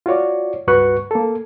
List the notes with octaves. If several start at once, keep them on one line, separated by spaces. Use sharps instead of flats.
F4 F#4 C#5 D5
C#2 G2 F#4 B4 C#6 F#6
A#3 A4